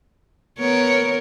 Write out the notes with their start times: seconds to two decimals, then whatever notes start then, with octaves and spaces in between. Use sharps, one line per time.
0.59 B3 A#4 C#5